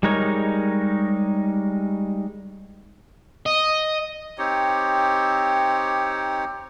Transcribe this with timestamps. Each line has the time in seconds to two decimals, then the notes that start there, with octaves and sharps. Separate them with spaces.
0.03 G3 G#3 D#4 A#4 C#5
3.46 D#5
4.38 C4 D#4 G4 C#5